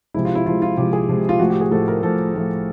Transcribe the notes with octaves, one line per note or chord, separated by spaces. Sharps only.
C3 F3 G#3 E4
F4
E4
C3 F3 G#3 F4
F4
C3 F3 G#3 G4
G#4
C3 F3 G#3
F4
A2 F3 A3 F#4
G4
G#4
A2 F3 A3 A4
A#4
A2 F3 A3 A4
A2 F3 A3